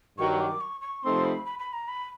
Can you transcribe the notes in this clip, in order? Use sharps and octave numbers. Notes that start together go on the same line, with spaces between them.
G2 D#3 F#3 C#6
D6
C#6
C#6
C3 F3 A3 C4 D#4 C6
B5
B5
B5
A#5
B5